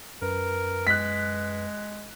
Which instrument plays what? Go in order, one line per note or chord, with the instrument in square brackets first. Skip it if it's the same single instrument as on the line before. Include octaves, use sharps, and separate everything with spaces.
[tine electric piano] F#2 B4 [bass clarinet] A#4
[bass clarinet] G#3 [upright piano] F#6 B6